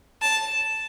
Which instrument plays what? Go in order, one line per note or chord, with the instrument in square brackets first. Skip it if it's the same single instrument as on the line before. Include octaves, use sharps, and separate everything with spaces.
[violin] A5